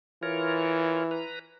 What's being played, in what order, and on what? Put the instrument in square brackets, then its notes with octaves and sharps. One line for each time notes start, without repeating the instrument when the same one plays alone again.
[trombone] E3 [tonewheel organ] F4 A#4 C#5
[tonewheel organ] B4 A#5